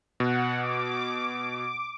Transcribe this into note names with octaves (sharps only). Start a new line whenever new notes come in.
B2 F#5
D6